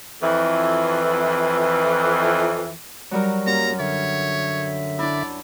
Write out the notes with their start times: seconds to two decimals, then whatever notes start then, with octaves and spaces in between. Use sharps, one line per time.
0.22 F2 E3
3.11 F#3 G3 A#4
3.47 F#2 F#3 G3 A#3 A#5
3.80 D3 C#5 E5
4.99 D4 E4 D5